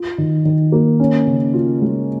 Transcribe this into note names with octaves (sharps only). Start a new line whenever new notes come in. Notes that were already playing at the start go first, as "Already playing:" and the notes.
Already playing: F4
D#3
D#3
A#3
C#4
C#3
F4
G#3